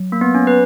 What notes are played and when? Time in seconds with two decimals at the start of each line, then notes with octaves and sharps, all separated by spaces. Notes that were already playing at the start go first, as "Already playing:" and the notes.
Already playing: F#3
0.12 A#3
0.21 B3
0.35 C#4
0.47 B4